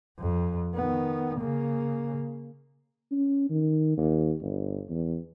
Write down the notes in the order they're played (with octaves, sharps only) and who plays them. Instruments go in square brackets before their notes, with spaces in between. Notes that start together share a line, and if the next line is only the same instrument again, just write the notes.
[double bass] F2
D#3 B3
C#3 A#3
[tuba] C#4
D#3
D#2
G1
E2